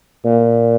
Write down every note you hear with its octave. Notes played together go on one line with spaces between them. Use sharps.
A#2